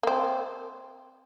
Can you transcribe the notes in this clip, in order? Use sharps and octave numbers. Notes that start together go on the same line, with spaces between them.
A#3 C4